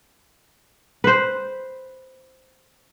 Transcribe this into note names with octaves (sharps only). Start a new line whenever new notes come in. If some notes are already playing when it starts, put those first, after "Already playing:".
B4 C5